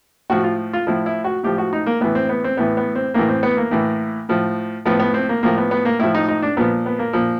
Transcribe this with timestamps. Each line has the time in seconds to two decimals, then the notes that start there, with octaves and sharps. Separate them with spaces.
0.30 A2 F3 F#4
0.44 F4
0.73 F4
0.87 A2 F3 E4
1.06 E4
1.24 F#4
1.43 A2 F3 G4
1.58 F#4
1.73 D#4
1.86 A#3
2.01 A2 E3 B3
2.15 C4
2.29 B3
2.44 C4
2.57 A2 E3 B3
2.77 B3
2.95 C4
3.14 A2 E3 A#3
3.29 C4
3.43 B3
3.57 A#3
3.71 A2 E3
4.29 A2 F3
4.85 A2 F3 B3
5.00 B3
5.14 C4
5.29 A#3
5.43 A2 F3 A#3
5.57 B3
5.71 B3
5.85 A#3
5.99 A2 F3 E4
6.15 D#4
6.28 D#4
6.42 D4
6.57 A#2 F3 B3
6.86 B3
6.99 A#3
7.13 A#2 F3